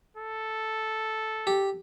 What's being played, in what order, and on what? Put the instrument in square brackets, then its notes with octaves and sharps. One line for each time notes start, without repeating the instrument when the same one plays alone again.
[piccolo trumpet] A4
[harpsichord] G4